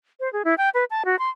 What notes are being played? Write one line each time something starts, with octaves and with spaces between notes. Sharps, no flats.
C5
G#4
E4
G5
B4
A5
F#4
C6